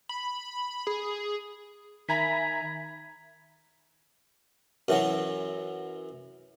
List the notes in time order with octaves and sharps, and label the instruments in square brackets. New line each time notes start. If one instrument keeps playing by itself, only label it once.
[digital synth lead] B5
G#4
[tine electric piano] D#3 [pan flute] E5 [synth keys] G#5 A#5 B5 [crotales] G#6 B6
[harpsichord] F#2 E3 F#3